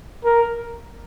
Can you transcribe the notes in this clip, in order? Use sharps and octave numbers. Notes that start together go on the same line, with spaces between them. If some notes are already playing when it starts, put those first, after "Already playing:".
A#4